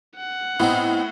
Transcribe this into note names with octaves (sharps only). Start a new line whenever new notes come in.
F#5
A2 B3 C4 D#4